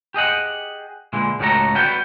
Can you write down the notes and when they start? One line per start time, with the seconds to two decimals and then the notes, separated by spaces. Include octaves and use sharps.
0.14 G4 G#4 D#5 F#5
1.13 A#2 D3 E3 G#3
1.39 C#2 A2 A3 F#4 A4 A#5
1.75 G3 B3 F#4 G5